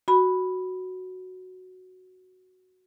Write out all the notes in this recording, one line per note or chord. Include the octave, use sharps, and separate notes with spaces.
F#4 B5